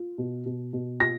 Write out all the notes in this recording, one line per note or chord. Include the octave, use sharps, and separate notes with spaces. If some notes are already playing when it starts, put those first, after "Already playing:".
Already playing: F4
B2
B2
B2
F4 A#6